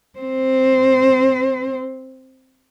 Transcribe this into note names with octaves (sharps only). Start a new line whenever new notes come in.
C4 C5